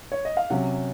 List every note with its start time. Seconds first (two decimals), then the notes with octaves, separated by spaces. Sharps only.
0.12 C#5
0.25 D#5
0.37 F5
0.50 C3 F#3 C#4 F#5